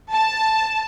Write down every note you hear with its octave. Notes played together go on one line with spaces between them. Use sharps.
A5